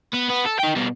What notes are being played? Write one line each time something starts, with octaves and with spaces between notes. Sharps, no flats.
B3
B3
A4
D#4 G5
B2 G3